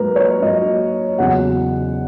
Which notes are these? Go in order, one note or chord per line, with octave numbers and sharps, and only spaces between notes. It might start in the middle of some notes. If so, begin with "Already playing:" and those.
Already playing: G#2 F#3 A#3 A#4 B4
C#5
G#2 F#3 A#3 D#5
E2 C#3 F#3 C#4 F#5